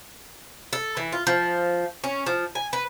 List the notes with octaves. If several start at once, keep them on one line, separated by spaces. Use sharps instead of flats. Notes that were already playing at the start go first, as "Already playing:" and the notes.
A4
E3
F4
F3
C#4
F3
G#5
B4